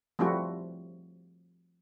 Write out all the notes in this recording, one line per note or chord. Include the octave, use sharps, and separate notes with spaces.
F3 G3 A3 C4 E4 F#4